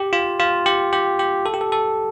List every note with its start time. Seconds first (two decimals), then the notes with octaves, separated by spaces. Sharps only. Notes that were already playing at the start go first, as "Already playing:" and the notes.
Already playing: G4
0.13 F4
0.39 F4
0.66 G4
0.93 G4
1.19 G4
1.46 A4
1.54 G4
1.61 A4
1.72 A4